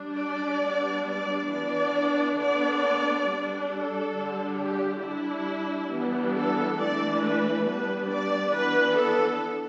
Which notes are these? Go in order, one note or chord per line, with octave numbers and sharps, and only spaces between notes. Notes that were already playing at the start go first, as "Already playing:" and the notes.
Already playing: G3 D4
D5
G3 B3 D4
D5
E3 B3 D4 D5
D3 B3 D4 D5
G3 D4
A4
D3 G3 D4
G4
G3 D4 E4
E3 G3 B3 D4
A4
E3 A3 D4 D5
B4
G3 B3 D4 B4
D5
E3 B3 D4 B4
A4